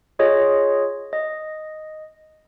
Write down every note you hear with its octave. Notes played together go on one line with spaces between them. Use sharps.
F4 G#4 C#5 D#5
D#5